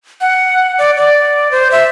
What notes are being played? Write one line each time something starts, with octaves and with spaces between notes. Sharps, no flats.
F#5
D5
D5
C5
E5